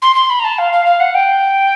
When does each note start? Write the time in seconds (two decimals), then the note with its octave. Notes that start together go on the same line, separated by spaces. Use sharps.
0.02 C6
0.15 C6
0.30 B5
0.40 A#5
0.44 A5
0.58 F5
0.73 F5
0.86 F5
1.00 F#5
1.14 G5